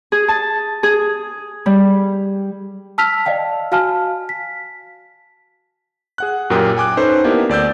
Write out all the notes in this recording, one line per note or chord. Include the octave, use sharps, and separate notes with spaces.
G#4
A5
G#4
G3
A5 E6 F6 B6 F7
D5 D#5 F5 G5 A5
F#4 F5 G#5 A5 F6
B6
G#4 F#5 F#6
F#2 A#2 G4 A#4 G5 D#6
G5 G#5 D6 F#6
C#4 D#4 A4 B4 C5
A#3 B3 D4 E4 G4 A#4
D2 D5 E6 G6